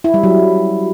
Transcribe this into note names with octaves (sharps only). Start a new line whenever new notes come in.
E4
G3
F#3